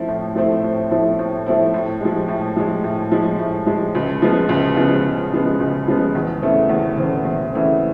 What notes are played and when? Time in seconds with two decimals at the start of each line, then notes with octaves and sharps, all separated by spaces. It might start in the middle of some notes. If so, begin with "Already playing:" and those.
Already playing: F3 A3 C4 E4
0.08 A2
0.35 F3 A3 C4 E4
0.64 A2
0.91 F3 A3 C4 E4
1.19 A2
1.46 F3 A3 C4 E4
1.74 A2
2.01 F3 G#3
2.28 A2
2.57 F3 G#3
2.84 A2
3.12 F3 G#3
3.39 A2
3.67 F3 G#3
3.95 C#2
4.22 C#3 F3 G#3 B3
4.49 C#2
4.76 C#3 F3 G#3 B3
5.04 C#2
5.32 C#3 F3 G#3 B3
5.60 C#2
5.87 C#3 F3 G#3 B3
6.15 E2
6.42 C#3 E3 A3 C4
6.69 E2
6.97 C#3 E3 A3 C4
7.25 E2
7.53 C#3 E3 A3 C4